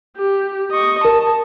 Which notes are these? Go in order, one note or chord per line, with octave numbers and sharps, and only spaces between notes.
G4
D#5 C#6
A#4 A5